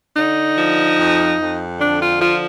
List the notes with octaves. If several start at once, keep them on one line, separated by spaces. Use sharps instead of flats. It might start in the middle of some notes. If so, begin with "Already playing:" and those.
D3 D#4
F3
F2
F2
D3 D4
F4
F3 F4